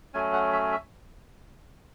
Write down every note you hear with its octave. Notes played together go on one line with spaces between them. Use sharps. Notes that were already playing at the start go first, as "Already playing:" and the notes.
F#3 A3 C#4 G#5
F#5
E5
E5